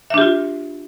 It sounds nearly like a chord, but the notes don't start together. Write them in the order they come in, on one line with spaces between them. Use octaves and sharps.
E5 D4 G4 F4